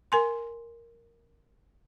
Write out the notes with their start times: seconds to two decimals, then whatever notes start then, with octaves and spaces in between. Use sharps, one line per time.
0.12 A#4 G#5 C6